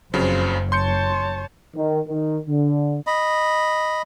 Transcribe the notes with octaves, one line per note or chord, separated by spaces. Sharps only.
F#1 F2 C#3 F#3 C5
C#5 A5 C6 G6 C#7
D#3
D#3
D3
D#5 B5